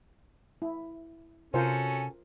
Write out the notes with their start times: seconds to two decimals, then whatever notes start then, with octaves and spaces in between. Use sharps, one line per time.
0.62 E4
1.54 C3 C#4 F4 F#4 A4 A#4 C5 G#5